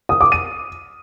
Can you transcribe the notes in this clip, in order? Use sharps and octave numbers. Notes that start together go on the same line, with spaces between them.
D#6
D6
D#7